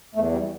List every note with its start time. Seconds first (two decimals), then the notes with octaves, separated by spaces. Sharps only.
0.15 E2 A3
0.32 G3